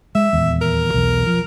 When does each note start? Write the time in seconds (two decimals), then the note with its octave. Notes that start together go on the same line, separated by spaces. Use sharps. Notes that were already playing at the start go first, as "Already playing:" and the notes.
0.15 G#3 E5
0.33 D#1 E2
0.61 A#4
0.94 B1 E2
1.26 F3